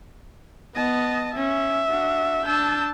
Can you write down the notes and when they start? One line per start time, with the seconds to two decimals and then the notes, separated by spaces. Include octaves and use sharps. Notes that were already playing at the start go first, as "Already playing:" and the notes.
0.75 B3 D#5 A5
1.36 C#4 E5
1.89 D4 F#4
2.45 D4 A5 E6 G6